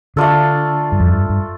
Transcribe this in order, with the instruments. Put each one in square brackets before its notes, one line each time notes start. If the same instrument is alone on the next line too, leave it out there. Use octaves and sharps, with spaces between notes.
[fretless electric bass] D3 [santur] A3 D4 F4 A4
[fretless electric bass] G2
F2
G2
G2